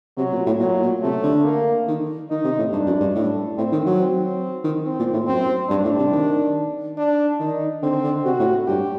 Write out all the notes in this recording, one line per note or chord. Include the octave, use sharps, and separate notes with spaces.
C3 F#3
A#2
A2
A#2 F#3
A#2
C3 A3
D3
A#3
D#3
D#3 D#4
C3
A2
G2 D4
F#2
G2
A2
A2 C4
D#3
F#3
C4
D#3
C4
A#2
A2
F#2 C4
G2 D4
A2
C3
D#3
D4
D#3 D#4
D3 C4
D3
C3 F#4
A2
G2 G4